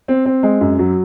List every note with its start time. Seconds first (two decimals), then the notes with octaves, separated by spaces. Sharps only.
0.08 C4
0.26 C4
0.43 G#3
0.61 F#2
0.79 F#3